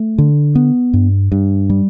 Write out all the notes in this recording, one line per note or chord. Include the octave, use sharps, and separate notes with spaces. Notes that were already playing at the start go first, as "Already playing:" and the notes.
Already playing: A3
D3
B3
G2
G2
G3